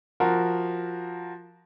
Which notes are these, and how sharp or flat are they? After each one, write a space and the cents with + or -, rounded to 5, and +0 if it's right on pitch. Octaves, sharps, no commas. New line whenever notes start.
F3 +0 F#4 +0 A#4 +0